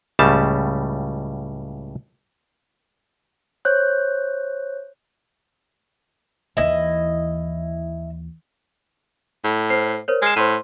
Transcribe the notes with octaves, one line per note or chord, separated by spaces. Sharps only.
C#2 A2 C#3 G3 A5
C5 C#5 F#6 G6
D#2 E3 E4 D#5
A2
C5 C7
A#4 C5 C#5
G#3 F6 C7 E7
A2 C5 C6 D#7